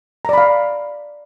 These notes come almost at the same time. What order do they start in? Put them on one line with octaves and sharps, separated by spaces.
A#5 D5 B5 F5